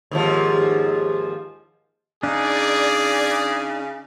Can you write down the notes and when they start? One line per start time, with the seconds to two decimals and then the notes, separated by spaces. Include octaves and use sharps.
0.11 D#2 G#2 F3
2.23 C#3 D4 D#4 G#4 D5